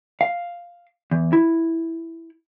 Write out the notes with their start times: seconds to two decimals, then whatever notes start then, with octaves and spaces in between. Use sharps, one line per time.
0.21 F5
1.11 E2
1.33 E4